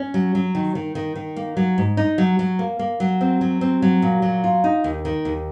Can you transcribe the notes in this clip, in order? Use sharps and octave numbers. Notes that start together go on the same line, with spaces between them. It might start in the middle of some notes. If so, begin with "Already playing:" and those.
Already playing: C#4
F#3
F#3
D#3
D#3
D#3
D#3
A#3
F#3
G#2
D#4
F#3
F#3
A#3
A#3
F#3
C4
F#3
C4
F#3
A#2
F#3
F4
D#4
D#2
D#3
D#2